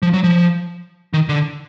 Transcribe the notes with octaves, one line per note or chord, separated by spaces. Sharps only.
F3
F#3
F3
D#3
D3